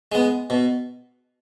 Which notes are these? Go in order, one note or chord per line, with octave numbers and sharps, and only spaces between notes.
G#3 B3
B2